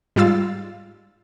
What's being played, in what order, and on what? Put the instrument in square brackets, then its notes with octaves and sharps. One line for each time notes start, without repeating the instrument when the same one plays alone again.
[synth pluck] G#2 G3 F4 F5 E6 A6